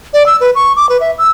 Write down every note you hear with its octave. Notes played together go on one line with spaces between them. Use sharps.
D5
E6
B4
C#6
D6
B4
E5
E6